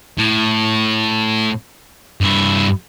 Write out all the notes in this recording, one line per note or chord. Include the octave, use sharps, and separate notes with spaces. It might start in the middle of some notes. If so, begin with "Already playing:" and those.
A2
G2 E4